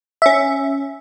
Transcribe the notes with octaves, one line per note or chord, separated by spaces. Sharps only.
C#4 E5